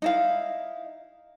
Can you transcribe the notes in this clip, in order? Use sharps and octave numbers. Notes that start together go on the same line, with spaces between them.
D#4 E4 F5